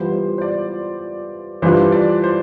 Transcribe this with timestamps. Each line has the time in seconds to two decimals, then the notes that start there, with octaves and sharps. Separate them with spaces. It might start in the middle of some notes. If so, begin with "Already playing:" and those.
Already playing: E3 G3 B3 F4 C5
0.13 C5
0.38 C5
0.42 D5
1.62 E3 G3 D4 F4 C5
1.92 D5
2.24 C5